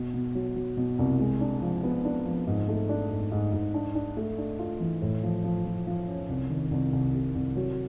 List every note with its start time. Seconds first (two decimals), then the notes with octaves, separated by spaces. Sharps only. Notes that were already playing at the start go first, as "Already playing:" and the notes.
Already playing: B2
0.14 B2
0.35 F#3
0.56 F#3
0.77 B2
0.99 C2
1.19 G#3
1.41 D4
1.62 F3
1.83 B3
2.05 D4
2.26 F3
2.47 G#2
2.68 A3
2.89 D4
3.11 G#2
3.32 G#2
3.53 G#2
3.74 D4
3.95 D4
4.17 A3
4.38 D4
4.59 F4
4.80 E3
5.02 A2
5.23 F3
5.44 F3
5.65 F3
5.87 F3
6.08 C#4
6.29 C2
6.50 D#3
6.71 C2
6.93 C2
7.14 C3
7.35 C2
7.56 F#3